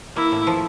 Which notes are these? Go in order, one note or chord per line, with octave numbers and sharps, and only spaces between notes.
A#3 E4
A2
F3